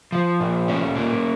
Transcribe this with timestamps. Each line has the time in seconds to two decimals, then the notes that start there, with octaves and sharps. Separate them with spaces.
0.12 F3
0.40 A#2
0.68 C#4
0.95 A#3